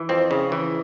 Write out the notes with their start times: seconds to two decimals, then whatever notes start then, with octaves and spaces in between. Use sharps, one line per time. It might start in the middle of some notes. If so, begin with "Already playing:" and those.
Already playing: E3
0.09 F2 C4
0.31 C#3
0.52 E3